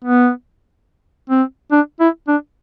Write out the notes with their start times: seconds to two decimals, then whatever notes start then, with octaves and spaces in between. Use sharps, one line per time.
0.05 B3
1.30 C4
1.72 D4
2.00 E4
2.28 D4